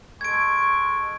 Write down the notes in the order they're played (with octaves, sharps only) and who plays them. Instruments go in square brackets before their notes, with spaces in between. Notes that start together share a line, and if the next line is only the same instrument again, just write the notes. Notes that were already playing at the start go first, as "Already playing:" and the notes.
[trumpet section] G#3 A4 C#6 [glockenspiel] G#6 D7